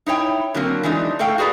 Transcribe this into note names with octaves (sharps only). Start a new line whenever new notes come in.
D#4 E4 C#5 G5
D3 F#3 A#3 C4
E3 G#3 D4 D#4
A3 A4 F5 G5
F#4 G#4 B4 D5 A#5